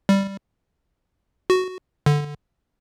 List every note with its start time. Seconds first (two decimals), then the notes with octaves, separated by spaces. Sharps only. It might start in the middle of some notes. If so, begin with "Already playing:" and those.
0.09 G3
1.50 F#4
2.06 D3